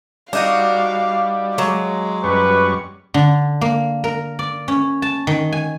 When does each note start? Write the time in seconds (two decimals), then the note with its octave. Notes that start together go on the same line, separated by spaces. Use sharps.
0.33 G3 D4 D#4 F#4 F5
1.58 F#3 G#3
2.24 F#2 G3 B4 C#6
3.14 D3
3.61 A#3
4.04 A#4
4.39 D5
4.68 C#4
5.02 A5
5.27 D#3
5.52 G#5